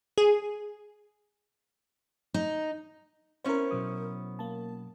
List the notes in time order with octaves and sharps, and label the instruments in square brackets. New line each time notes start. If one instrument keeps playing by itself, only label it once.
[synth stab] G#4
[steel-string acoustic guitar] D#4
[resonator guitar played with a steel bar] B3 C#4 E4 [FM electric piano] A#4 C5
[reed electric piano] B2 F#3 D#6
[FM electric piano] A#3 A5